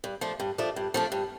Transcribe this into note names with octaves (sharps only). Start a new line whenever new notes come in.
G2
F3 A3 D4
G2
F3 A3 D4
G2
F3 A3 D4
G2